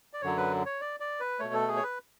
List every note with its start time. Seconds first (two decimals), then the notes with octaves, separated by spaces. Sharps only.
0.13 D5
0.22 F#2 D3 F#3 C#5
0.37 B4
0.66 C#5
0.81 D5
1.00 D5
1.20 B4
1.40 B2 A3 C#5
1.54 A4
1.68 G#4
1.76 C#5
1.83 B4